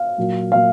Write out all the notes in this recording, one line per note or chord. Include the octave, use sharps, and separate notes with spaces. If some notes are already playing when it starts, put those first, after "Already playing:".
Already playing: F5
A#2 F#3 A#3
A#2 F#3 A#3 F5